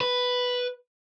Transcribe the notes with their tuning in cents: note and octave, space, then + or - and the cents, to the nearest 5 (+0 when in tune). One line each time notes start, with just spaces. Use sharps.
B4 +0